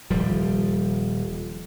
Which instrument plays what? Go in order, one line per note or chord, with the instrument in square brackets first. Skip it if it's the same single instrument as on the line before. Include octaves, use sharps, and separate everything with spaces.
[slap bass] D#1 F3 G3